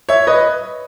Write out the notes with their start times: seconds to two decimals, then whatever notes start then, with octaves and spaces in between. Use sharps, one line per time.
0.09 C#5 E5
0.27 B4 D#5